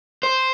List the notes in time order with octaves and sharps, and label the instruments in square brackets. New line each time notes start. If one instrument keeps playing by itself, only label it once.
[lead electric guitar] C5